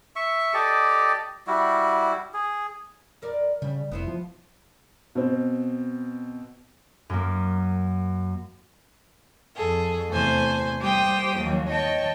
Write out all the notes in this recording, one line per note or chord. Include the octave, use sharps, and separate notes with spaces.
E5 C#6
G4 A4 D5 D#5
G3 E4 F#4
G#4
E2 A#4 D5
C#3 G3
F1 B3 E4 C5
F3
B2 C4
F#2 A#3
F2 G#4 A4
E2 C3 A3 C5 G#5 A5
G3 A#3 G4 C5 G5 D#6
D#2 F3 F#3 A#3
C#5 D#5 G5 A5 C#6